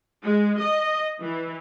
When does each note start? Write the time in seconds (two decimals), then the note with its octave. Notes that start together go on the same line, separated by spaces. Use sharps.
0.23 G#3
0.60 D#5
1.20 E3